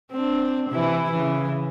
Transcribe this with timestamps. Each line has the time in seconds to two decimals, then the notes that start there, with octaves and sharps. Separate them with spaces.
0.11 C4 D4
0.69 C3 E3 E4
1.11 C#3 E3